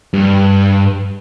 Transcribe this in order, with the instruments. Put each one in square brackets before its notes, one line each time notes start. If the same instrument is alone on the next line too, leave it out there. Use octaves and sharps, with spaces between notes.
[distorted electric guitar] G2